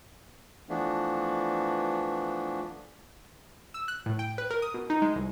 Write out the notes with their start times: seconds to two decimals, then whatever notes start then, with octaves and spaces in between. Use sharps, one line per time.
0.69 E3 F3 A3 B3 D4
3.74 E6
3.88 F#6
4.06 A2
4.19 G5
4.38 B4
4.51 A#4
4.62 D#6
4.74 B2
4.90 D#4
5.02 G#3
5.16 C2